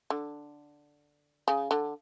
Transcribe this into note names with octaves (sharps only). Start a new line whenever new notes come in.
D3
C#3
D3